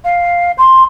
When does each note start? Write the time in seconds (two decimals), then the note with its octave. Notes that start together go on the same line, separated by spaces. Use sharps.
0.05 F5
0.58 C6